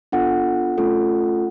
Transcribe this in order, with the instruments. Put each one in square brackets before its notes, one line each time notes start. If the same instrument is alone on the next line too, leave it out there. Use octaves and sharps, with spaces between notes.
[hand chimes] B3 D4 F4 A4 F#5
A3 C#4 F4 A4